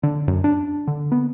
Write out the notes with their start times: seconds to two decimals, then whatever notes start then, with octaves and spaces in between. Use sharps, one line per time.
0.03 D3
0.28 F#2
0.44 D4
0.87 D3
1.12 B3